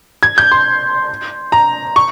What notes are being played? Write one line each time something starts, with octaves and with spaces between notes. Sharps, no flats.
G#6
G6
C6
A#5
C#6